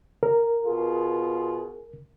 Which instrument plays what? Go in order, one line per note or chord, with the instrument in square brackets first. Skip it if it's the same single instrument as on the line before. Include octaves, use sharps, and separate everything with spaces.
[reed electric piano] A#4
[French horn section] B2 F4 G#4